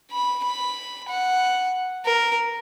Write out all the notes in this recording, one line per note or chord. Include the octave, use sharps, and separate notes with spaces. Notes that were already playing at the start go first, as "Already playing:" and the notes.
B5
B5
F#5
A#4